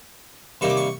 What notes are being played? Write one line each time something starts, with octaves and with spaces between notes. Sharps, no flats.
C3 D#3 G3 A#3 C#6
D6
C#6